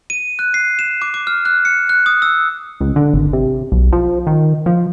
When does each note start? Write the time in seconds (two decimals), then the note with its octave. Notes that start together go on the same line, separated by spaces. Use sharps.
0.10 D#7
0.39 F#6
0.54 C7
0.79 E7
1.02 D6
1.14 D6
1.27 F6
1.45 F#6
1.65 C#7
1.89 F#6
2.06 D#6
2.22 E6
2.81 C#2
2.96 D3
3.14 G#1
3.33 C3
3.72 B1
3.93 F3
4.27 D#3
4.66 F3